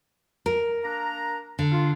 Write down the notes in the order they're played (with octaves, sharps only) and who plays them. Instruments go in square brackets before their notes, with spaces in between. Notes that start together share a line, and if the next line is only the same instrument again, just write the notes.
[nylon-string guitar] A#4
[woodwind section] A#3 D4 A#5
[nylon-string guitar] D3
[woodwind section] F4